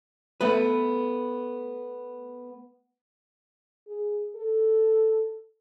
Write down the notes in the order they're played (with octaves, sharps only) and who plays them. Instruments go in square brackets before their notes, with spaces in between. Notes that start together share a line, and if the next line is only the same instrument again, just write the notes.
[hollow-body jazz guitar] A3 B3 B4
[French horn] G#4
A4